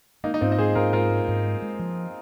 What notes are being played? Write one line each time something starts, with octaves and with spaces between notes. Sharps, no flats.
G#3 A#3 D#4
D#4
G#2 C4 F4
D#5
G#2 G#4 C5
G#2 F4 A#4
G#2 F4 A#4
G#3
G#2
G#3
G#3
F3